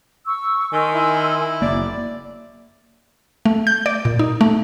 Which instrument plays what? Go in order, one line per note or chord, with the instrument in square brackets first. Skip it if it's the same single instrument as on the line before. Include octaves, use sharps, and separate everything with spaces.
[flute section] C#6 E6
[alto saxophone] D#3 [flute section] G#5 C6 E6
[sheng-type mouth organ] E4
[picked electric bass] F#1 A#3 [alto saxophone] D5
[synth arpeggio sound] A3
G6
D5
A#2
D#4
A3